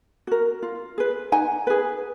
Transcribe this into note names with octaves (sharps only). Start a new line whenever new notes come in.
F#4 A#4
F4
G#4 B4
D#4 F#5 G#5
G#4 B4